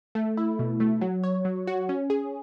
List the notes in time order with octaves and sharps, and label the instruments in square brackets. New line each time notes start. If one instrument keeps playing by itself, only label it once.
[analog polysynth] A3
E4
B2
A3
F#3
C#5
F#3
F#4
C#4
G#4